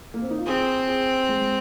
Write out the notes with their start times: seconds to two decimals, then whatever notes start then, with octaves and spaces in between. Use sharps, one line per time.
0.14 A#3
0.22 C4
0.30 D#4
0.38 F4
0.46 C4 G#4
0.88 G#4
1.29 G#3